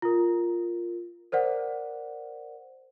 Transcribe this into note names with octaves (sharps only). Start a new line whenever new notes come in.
F4 A#4
A#4 C5 D5 F#5